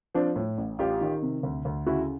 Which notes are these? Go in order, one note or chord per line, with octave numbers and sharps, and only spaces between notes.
F3 C4 D4
A2
A1
A1 F4 G4
D#3
C3
D2
D2
C#3 E4 F#4